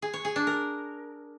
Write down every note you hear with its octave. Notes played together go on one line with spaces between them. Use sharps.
G#4
C#5
G#4
D4
A#4